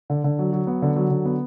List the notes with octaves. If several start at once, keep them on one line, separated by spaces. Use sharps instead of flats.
D3
D3
F#3
F#3
B3
D3
F#3
D3
B3